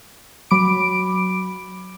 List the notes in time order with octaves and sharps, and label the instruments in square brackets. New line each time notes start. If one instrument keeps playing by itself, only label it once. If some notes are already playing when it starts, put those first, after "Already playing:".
[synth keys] F#3 B5 D6 D7